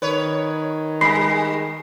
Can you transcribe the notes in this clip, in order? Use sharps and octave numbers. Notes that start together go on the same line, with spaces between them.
D#3 B4 C#5
G3 B5 C7